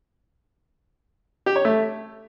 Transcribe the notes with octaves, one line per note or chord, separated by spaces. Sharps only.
G4
C#5
A3